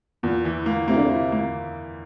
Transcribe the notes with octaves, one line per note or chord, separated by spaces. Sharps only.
E2 A#2
E3
A#3
C3 A#3
D3
C3 A#3
A#3